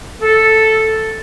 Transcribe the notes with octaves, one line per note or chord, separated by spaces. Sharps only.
A4